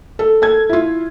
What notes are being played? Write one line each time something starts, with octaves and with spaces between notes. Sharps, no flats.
A4
A4 A5 G#6
E4 F4